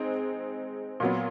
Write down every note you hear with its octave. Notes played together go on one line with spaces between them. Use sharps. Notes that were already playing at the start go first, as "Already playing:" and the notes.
Already playing: G#3 C4 D#4 G#4
A#2 F#3 B3